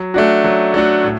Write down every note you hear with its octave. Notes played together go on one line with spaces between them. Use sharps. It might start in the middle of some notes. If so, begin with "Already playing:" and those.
Already playing: F#3
A3 D4 F#4
F#3
A3 D4 F#4
A2